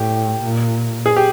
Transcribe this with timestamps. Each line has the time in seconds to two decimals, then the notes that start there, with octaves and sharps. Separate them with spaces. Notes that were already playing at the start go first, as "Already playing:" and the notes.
Already playing: A2 G4
0.43 A#2
1.06 G#4
1.17 G4